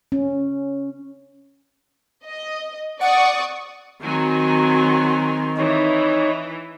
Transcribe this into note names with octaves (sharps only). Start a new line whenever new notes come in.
C#4
D#5
D5 F#5 C#6 D#6
D#3 F#3 C4 G#5
E3 D#4 C#5